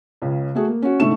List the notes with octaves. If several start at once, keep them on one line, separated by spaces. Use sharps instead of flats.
C#2 C#3
A3 F#4 G#4
A#3
C#4 F#4
C2 G#2 D3 A3 C#6 E7